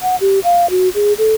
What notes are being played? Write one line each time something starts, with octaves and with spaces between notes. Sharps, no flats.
F#5
G4
F5
F#4
G#4
A4